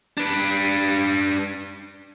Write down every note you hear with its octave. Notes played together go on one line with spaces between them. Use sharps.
D4 B4